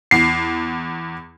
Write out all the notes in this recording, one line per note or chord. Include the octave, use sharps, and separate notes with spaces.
E2 C7